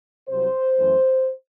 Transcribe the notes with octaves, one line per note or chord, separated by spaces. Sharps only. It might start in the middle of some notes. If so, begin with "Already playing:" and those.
C2 C3 F#3 C5
F#2 E3 A3